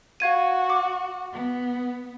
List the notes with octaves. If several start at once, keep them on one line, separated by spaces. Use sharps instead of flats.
F#4 F5 G#6 D#7
D6
B3